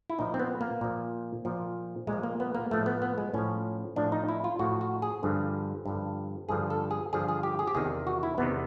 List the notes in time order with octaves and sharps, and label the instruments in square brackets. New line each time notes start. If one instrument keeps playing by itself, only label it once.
[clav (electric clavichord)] E4
A#2 F3 D#4
C4
B3
A#3
A#2 F3
A#2 F3
A#2 G#3
F3
A#3
B3
A#3
A2 F3 A3
B3
B3
G#3
A2 F3 C#4
A2 F3 D4
D#4
E4
F4
A2 F3 F#4
F#4
G#4
G2 D3 F3
G2 D3 F3
G2 D3 F3 G#4
A4
G#4
G2 D3 F3 G#4
G#4
G4
G#4
G4
E2 C3 D#3 G#4
F#4
E4
E2 C3 D#3 B3